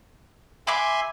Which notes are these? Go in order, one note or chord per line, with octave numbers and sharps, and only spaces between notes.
E5 G#5 B5 C6 D6